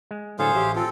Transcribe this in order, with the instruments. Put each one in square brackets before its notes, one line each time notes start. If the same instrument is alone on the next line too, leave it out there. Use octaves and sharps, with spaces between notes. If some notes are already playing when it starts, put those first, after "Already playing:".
[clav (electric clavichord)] G#3
[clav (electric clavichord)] A2 D3 F#3 [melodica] G#4 C5 F5 [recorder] A4
[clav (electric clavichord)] A1 F#4 E5 [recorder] G4
[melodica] C4 A4 [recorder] F4